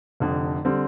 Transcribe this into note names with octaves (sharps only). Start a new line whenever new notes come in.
F1 F2 D3
D3 G3 C4